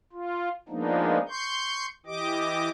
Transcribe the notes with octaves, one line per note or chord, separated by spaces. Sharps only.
F4
F3 G#3 A#3 B3 D4 D#4
C6 C#6 G6
E3 G4 D#5 D6